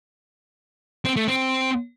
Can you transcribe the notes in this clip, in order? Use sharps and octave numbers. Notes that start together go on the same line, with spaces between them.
C4
A3
C4